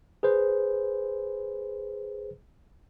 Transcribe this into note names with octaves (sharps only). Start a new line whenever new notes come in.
G#4 B4 C5